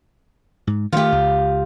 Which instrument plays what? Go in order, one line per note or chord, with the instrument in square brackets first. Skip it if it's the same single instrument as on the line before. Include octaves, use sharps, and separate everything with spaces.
[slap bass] G#2
[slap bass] D#3 E3 A3 [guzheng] F4 G4
[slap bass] C#2